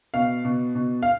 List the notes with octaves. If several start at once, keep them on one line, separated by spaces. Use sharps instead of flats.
B2 F5
B2
B2
F5